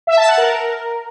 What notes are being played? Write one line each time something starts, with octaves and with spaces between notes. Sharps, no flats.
E5
A5
F#5
A#4